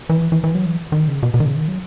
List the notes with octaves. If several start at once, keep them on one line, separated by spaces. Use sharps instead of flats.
E3
E3
E3
F#3
E3
D#3
C#3
B2
B2
D#3
C#3
D#3
F#3